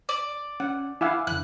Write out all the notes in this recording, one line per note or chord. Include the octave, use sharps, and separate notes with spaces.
D5
C#4 F#5
E4 F5 F#5 G#5 D6 E6
F2 D3 F#6